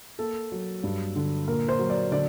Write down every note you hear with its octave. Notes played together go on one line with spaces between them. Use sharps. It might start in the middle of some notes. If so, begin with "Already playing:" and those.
A#3 A4
F#3
G2
D3
A#2 A#4
C5
F#3
D5
D3 D5